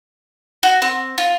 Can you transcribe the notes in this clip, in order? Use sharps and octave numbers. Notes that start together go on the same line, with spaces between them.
F#4
C4
F4